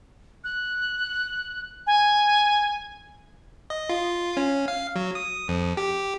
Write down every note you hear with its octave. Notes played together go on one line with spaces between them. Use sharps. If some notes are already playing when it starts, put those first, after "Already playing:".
F#6
G#5
D#5
F4
C#4
F5
F#3
D#6
F2
G4